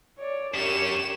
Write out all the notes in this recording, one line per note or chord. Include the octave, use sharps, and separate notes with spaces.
C#5 D5
F#2 C#4 G4 A#4 E7